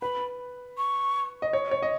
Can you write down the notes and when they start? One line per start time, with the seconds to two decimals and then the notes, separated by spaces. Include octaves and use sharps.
0.02 B4 B5
0.77 C#6
1.42 D#5
1.53 C#5
1.71 C#5
1.82 D#5